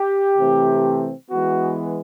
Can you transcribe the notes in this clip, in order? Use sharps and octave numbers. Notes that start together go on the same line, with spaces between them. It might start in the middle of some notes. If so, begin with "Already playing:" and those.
Already playing: G4
C3 E3 A3 C4
E3 G#3 B3 F#4